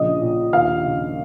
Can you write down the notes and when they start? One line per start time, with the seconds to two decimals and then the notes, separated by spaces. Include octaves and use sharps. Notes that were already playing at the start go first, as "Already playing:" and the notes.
Already playing: A#1 C#3 D#5 D#6
0.21 A#2
0.53 D#2 F5 F6
0.84 C#3